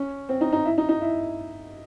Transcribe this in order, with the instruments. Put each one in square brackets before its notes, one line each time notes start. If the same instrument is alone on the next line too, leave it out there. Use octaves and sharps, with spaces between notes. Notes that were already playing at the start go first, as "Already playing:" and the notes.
Already playing: [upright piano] C#4
C4
D#4
D#4
E4
D#4
D#4
E4